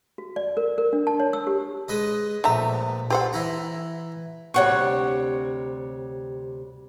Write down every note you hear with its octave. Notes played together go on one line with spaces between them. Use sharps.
F#4
D5
A#4
A#4
D4
A5
C#5
E6
G4
G#3 B4 D#5
A#1 A3 B4 E5 A#5
G4 A4 C5 F#5
E3 E4 A#5
D2 C3 G3 C#5 F#5 C#6